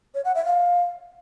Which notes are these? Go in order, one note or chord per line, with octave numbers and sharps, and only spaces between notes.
C#5
F#5
E5
F5